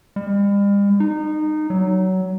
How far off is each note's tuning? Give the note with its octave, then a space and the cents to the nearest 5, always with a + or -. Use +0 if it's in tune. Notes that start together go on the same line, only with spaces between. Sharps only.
G3 +45
D#4 -20
F#3 +20